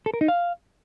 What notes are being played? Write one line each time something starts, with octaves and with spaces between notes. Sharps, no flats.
A4
A#4
D#4
F5